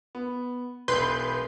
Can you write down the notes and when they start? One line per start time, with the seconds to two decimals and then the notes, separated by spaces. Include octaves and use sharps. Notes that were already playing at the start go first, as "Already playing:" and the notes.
0.15 B3
0.88 E1 B1 B4 C6 G6